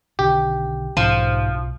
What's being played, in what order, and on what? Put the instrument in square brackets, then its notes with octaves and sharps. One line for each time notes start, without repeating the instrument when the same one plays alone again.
[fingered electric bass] B1 D3 D#3 [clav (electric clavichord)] G4
[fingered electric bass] B1 [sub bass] G#2 [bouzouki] F3